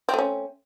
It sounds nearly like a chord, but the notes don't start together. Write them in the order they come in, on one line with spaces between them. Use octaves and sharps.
C4 A3 C#4